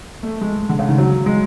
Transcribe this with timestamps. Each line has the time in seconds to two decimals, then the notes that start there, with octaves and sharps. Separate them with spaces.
0.23 A3
0.41 G#3
0.69 D3
0.79 C#3
0.88 D#3
0.98 F#3
1.26 G#3